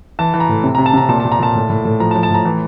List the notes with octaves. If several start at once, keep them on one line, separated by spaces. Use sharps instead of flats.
E3 A5
E3
A#5
A2
C3
C3 A#5
A5
C3 A#5
A#2 A5
A#2 A5
A#5
A#2 A5
A2
A2
A2
F3 A#5
A5
F3
A5
A2 A#5
E3